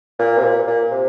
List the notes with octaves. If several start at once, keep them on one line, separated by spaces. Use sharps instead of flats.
A#2
C3
A#2
A#2
C3